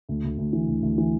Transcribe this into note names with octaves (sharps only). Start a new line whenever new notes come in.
D2
D2
D2
E3
D2
D2
E3